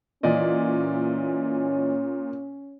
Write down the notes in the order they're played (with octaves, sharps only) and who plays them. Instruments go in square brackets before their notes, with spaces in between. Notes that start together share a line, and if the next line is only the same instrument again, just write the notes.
[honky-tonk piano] A#2 [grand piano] E3 D5 D#5 [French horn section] C#4